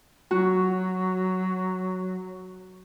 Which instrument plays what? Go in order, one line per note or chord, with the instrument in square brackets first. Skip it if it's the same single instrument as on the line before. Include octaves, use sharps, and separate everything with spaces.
[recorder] F#3 [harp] F#4